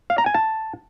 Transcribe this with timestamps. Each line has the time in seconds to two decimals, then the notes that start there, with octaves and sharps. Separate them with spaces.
0.10 F5
0.18 A#5
0.26 G#5
0.34 A5